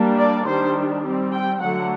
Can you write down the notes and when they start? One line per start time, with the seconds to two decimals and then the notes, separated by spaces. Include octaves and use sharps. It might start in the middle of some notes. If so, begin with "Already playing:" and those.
Already playing: G3 A#3 D4
0.18 D5
0.46 D#3 G3 D4 C5
1.03 G3 C4
1.32 G5
1.61 D3 F#3 A3 F#5